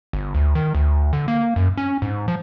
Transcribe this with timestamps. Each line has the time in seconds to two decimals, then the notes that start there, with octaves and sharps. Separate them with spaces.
0.13 G1
0.34 D2
0.55 D#3
0.75 D2
1.13 D3
1.28 A#3
1.56 F#2
1.77 C#4
2.02 G#2
2.28 F3